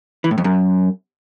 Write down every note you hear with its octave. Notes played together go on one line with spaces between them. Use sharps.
E3
A2
F2
F#2